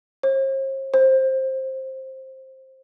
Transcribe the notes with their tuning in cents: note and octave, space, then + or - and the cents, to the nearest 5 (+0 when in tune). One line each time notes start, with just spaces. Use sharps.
C5 +45
C5 +15